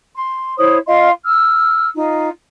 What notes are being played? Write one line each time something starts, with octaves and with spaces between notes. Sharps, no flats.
C6
E4 C5 C#5 D#6
F4 D#5 F5 C6
E6 F6
D#4 F4